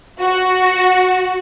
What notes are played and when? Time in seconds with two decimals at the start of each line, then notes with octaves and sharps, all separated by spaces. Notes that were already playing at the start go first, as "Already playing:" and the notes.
0.21 F#4